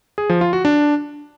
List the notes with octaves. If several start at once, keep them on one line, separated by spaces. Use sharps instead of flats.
G#4
F3
F4
F#4
D4